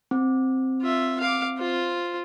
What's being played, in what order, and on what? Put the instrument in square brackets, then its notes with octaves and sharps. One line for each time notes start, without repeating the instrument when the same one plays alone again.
[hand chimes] C4
[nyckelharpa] F4 E5
F5 D6
F4 C5